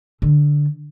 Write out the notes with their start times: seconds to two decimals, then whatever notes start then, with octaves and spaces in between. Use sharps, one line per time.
0.22 D3